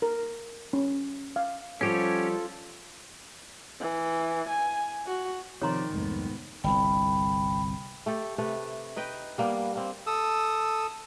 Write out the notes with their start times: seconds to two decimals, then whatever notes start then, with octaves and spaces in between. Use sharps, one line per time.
0.02 A#4
0.73 C#4
1.36 F5
1.81 F3 G3 B3 C#4 F4 G4 A4 C#5
3.81 E3
4.49 G#5
5.07 F#4
5.62 C3 D#3 F3 C#5 D5 A#5 C6
5.93 C2 F2 G#2 A3 B3
6.64 G1 C2 G5 B5
8.06 A3 G4 A4
8.38 C3 A3 A4 B4
8.96 D#4 B4 D#5 G5
9.38 G3 A#3 B3 D4
9.75 A#3 C4
10.07 A4 D#6 E6